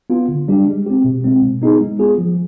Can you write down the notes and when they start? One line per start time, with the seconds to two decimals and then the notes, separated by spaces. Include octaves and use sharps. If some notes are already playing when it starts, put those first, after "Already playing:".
0.10 B3 F4
0.29 D3
0.48 G3 D4 G4
0.66 G#3
0.86 C4 G4
1.04 B2
1.24 G#3 C4
1.42 B2
1.62 B3 D#4 G#4
1.80 G#3
1.99 B3 F4 G#4
2.18 F3